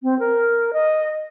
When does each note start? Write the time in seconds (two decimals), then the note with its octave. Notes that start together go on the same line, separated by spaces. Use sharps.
0.03 C4
0.19 A#4
0.73 D#5